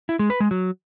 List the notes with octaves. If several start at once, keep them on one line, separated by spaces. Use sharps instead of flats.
E4
G#3
B4
G#3
F#3